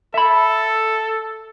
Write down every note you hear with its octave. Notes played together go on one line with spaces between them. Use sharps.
A4 E5 B5